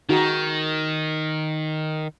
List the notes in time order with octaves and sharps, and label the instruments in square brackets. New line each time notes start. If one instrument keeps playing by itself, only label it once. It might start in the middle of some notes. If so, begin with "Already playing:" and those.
[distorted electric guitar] D#3 [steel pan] D#4 F#4 G#4